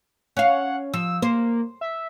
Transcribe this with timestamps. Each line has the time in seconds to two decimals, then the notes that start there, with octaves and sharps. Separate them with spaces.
0.37 C#4 F5 F#5
0.94 F3 E6
1.22 A#3 C5
1.81 E5